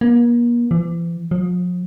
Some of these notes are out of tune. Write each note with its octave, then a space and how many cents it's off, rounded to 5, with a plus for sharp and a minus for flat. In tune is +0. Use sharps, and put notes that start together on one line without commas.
A#3 +40
E3 +45
F3 +40